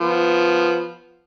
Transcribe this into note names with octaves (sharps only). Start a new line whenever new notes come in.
F3 B3